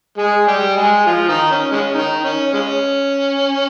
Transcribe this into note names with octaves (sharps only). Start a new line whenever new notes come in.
G#3 G#4
G3 G4
G#3 G#4
F3 F4
D#3 D#4
C#4
G#3 C#4
D#3 D#4
C#4
G#3 C#4